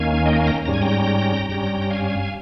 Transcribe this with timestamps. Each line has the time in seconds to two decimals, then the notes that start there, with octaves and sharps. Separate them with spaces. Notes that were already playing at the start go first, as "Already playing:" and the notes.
Already playing: D#2 D#3 A#3 C#4 F5 G#5
0.26 D#5 G5
0.37 F5 G#5
0.47 G5 A#5
0.65 G#2 G3 C#4 A#5
0.74 G#5
0.82 G5 A#5
1.49 G2 G3 C#4 G5 A#5
1.82 A#5
1.91 F5 G#5